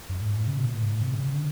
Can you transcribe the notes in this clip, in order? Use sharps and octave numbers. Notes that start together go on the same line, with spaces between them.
F#2
A2
G#2
A2
C#3
B2
A#2
A2
G#2
A2
C3
C#3
C#3
D3